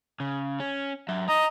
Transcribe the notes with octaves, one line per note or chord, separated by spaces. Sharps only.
C#3
C#4
F#3 E5
D#5 A#5